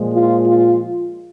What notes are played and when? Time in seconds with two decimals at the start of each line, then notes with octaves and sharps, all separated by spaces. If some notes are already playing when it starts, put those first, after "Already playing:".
Already playing: A#2 F3 G#3
0.14 F4
0.46 F4